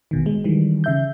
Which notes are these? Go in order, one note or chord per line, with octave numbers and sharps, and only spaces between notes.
A1 B2 D#3
G#3
D#3 E3 G3
C#3 E5 G6